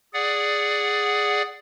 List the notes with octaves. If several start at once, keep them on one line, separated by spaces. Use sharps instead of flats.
G#4 D5 F#5